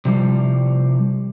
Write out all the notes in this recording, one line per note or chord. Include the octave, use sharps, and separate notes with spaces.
C3 F3 G3